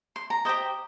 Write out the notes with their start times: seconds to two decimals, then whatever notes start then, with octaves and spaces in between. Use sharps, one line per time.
0.16 C6
0.30 A#5
0.45 G4 C5 D#5